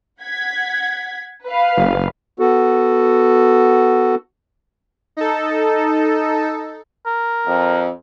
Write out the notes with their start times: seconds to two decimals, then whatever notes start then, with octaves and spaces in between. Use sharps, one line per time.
0.22 F#5 G#6 B6
1.46 B4 F5
1.77 F#1
2.39 B3 F#4 A4
5.17 D#4 A4
7.06 A#4
7.47 F2